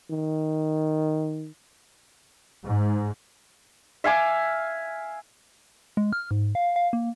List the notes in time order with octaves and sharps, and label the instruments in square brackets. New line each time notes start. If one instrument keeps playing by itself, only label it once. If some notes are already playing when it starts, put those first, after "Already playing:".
[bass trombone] D#3
[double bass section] G#2
[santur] E5 F5 G#5 D6
[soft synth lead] G#3
F6
G#2
F5
F5
A#3